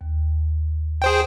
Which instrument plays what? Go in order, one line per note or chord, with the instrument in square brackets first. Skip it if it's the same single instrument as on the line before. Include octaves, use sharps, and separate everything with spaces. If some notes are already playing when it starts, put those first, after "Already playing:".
[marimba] D#2
[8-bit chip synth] G#4 C5 G5